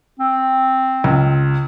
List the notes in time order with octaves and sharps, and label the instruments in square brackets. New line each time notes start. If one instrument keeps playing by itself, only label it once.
[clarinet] C4
[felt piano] C#2